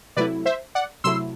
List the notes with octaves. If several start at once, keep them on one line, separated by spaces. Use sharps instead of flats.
C3 F#3 A3 E4 B4 D5
C5 E5
D5 F#5
C3 F#3 A3 E4 C6 E6